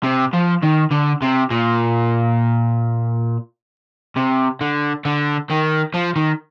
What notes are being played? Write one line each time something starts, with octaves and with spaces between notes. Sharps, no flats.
C3
F3
D#3
D3
C3
A#2
C3
D3
D3
D#3
F3
D#3